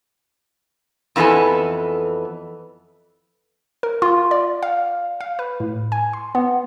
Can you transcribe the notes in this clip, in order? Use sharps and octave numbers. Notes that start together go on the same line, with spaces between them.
F2 E3 B3 F#4 A4 G#5
A#4
F4
D5
F5
F5
B4
A2
G#5
C6
B3